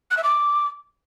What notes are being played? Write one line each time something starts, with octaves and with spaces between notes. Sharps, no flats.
F#6
E5
D6